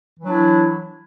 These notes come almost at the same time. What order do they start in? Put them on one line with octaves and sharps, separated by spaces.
E3 F#3 D4 E4